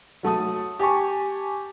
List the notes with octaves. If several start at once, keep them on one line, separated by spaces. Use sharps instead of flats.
F#3 A3 A5 D#6
G4 G#5 A5 C#6